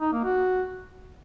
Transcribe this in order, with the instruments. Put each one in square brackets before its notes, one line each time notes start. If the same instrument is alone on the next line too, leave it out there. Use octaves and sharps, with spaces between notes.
[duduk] D#4
A#3
F#4